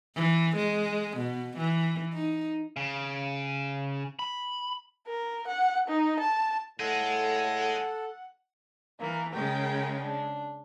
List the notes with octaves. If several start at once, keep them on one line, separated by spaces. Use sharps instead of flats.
E3
G#3
B2
E3
D#4
C#3
B5
A#4
F#5
D#4
A5
A2 G#4 A4 D#5 F#5
E3 A#3 A#4
C#3 G#3 A#4 G5
D4